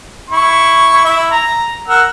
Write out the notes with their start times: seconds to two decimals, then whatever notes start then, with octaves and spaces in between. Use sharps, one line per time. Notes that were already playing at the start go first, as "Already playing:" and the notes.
0.30 E4 C#6
1.05 E4 E5
1.32 A#5
1.88 A#4 F#5 E6